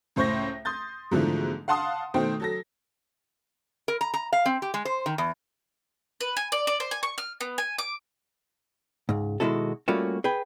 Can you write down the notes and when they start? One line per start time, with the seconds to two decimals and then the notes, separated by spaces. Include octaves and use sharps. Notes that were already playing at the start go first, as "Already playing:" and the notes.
0.16 C#2 A2 C5 C#6 G6 A#6
0.65 C6 D#6 G6 A6
1.11 G#2 B2 D3 E3 F3 A3
1.68 F5 F#5 A5 C6 D#6
2.14 B2 D#3 A3 C5 G5
2.40 F#3 A4 A#6
3.88 A#4
4.01 A#5
4.14 A#5
4.33 F5
4.46 C4
4.62 G4
4.74 G#3
4.85 C5
5.06 D#3
5.18 E2
6.21 B4
6.37 G#5
6.52 D5
6.67 D5
6.80 C5
6.91 G#5
7.03 C#6
7.18 F6
7.40 B3
7.58 G#5
7.78 D6
9.09 C#2 G#2
9.40 B2 D#3 G#3 E4 F#4 A4
9.88 G3 A3 A#3 C#4 F4 F#4
10.24 G#4 B4 G5